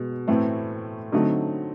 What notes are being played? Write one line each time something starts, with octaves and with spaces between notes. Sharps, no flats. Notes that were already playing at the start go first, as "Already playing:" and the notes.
Already playing: B2 G#3
A2 E3 A3 C4
D3 F#3 A3 C4 D#4